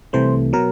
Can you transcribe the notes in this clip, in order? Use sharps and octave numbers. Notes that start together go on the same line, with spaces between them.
C2 C3 E3 A3 C5
B2 F#3 A#4